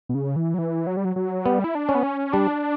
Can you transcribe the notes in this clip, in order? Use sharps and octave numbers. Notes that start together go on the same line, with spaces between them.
B2
C#3
E3
F#3
E3
F#3
G3
F#3
F#3
G3 B3
E4
D4
C#4
B3
C#4
G3 D4